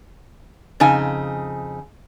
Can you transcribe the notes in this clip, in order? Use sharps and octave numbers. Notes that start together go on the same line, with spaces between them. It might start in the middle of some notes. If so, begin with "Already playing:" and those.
F2 C#3 D#4 G#5